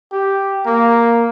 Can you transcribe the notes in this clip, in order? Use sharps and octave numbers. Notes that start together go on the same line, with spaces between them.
G4
A#3